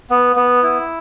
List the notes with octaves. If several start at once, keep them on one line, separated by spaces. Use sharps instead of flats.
B3
B3
E4